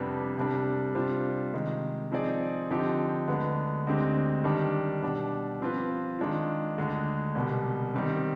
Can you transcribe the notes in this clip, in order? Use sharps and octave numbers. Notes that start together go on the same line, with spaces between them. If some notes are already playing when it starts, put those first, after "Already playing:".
Already playing: F2 C3 G3 B3 D4
C2 C3 G3 D4
C3 G3 D4 F4 C5
C3 D#3 G#3
F3 C4 D#4 G#4 D5
D3 F3 C4 D#4 G4
D2 D3 G#3 B3
D2 D3 G#3 C4 G4
D#3 G3 D4
B2 G3 D4
F3 C4 F4 B4
D#3 G#3 D4 F4
D2 D3 G#3
C2 B2 G3
D#3 G3 C4